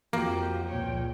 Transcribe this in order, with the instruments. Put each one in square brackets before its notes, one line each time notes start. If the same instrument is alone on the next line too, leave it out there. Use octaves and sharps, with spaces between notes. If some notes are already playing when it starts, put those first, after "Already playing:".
[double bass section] F2 [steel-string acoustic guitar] F3 [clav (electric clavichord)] A#3 [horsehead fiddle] F#4 G4
[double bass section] C#2 A#2 [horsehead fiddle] C#5 G5